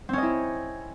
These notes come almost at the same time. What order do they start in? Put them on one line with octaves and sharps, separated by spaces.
C4 C#4 D#5 E4